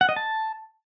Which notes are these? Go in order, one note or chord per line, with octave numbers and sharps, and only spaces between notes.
F#5
D#5
A5